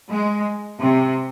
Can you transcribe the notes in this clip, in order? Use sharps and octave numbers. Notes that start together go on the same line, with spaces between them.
G#3
C3